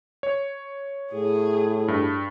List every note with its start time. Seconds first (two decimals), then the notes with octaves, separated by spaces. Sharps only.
0.23 C#5
1.13 A2 G#4
1.88 G2